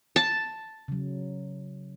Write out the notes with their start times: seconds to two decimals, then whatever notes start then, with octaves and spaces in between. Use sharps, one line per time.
0.16 A5
0.88 C#3 F#3